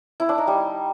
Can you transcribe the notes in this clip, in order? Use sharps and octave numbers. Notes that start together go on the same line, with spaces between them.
E4
D4
D#4
G3